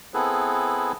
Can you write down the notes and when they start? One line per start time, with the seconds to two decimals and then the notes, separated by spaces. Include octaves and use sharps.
0.14 B3 C4 E4 G#4 A4 B4